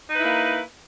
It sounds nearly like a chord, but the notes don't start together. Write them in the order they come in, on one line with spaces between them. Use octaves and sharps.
D#4 B4 E4 A#3